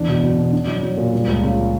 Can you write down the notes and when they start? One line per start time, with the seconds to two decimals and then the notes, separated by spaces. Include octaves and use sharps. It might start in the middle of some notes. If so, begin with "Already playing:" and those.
Already playing: E2 D4
0.08 B2
0.23 B2
0.38 B2
0.53 D4
0.67 F#3
0.83 F#3
0.97 A#2
1.13 G3
1.28 C#2
1.43 C#3